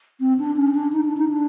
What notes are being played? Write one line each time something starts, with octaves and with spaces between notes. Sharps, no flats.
C4
D4
C#4
D4
D#4
D4
D#4
D4